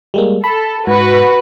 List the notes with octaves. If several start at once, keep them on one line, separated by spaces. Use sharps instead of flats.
G3 G#3 A#3
A4 B5
G#2 F#4 B4